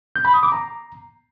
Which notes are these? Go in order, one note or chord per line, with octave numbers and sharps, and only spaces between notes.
G6
B5
D#6
D6
A#5